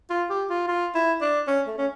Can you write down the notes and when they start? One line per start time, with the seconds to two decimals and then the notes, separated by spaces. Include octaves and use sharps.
0.10 F4
0.29 G4
0.50 F4
0.68 F4
0.95 E4
1.21 D4
1.47 C#4
1.67 A3
1.78 C#4